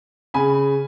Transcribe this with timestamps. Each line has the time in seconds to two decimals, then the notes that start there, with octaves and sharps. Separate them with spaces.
0.34 C#3 G#5 B5